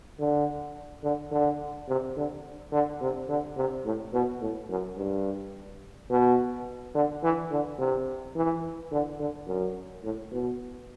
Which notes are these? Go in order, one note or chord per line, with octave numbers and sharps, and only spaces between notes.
D3
D3
D3
C3
D3
D3
C3
D3
C3
A2
B2
A2
F#2
G2
B2
D3
E3
D3
C3
E3
D3
D3
F#2
A2
B2